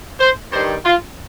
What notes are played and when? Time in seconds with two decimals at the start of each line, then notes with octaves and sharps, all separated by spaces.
0.20 C5
0.52 G2 D#3 G3 C5
0.85 F4